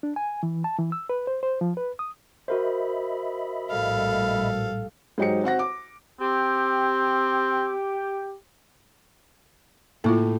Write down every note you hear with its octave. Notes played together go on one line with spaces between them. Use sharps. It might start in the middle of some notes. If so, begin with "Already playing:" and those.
D4
G#5
E3
A5
E3
E6
B4
C5
C5
F3
B4
D#6
F#4 A#4 C5 D#5 E5 B5
A#1 A2 G3 A4 F5
G#2 F#3 D#4 G4 C5 C#7
C4 F#4 F#5 A#6
D6
C4 G4
A2 A#3 E4 F4